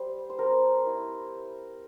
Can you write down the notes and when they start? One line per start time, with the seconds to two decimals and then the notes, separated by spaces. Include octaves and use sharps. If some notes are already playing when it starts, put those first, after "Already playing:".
Already playing: G3 C5
0.30 C5
0.39 C4 A#4
0.86 E4